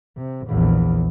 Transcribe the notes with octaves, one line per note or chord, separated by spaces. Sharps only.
C3
A#1 E2